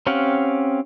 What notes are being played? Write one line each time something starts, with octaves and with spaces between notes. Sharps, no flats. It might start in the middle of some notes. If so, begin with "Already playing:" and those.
C4 C#4 G4 F5 F#5